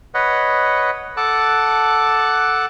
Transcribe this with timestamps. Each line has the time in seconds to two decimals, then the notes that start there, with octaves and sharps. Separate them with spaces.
0.14 B4 C#5 D#5 F#5
1.17 A4 F#5 A5 D6 F#6